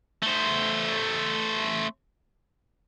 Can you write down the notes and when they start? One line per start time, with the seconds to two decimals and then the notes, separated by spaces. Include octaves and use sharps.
0.23 A3 C5